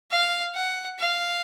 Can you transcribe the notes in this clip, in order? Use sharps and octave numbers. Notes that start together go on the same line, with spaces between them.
F5
F#5
F5